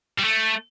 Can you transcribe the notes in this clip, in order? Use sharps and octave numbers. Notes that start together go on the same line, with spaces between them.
G3
A3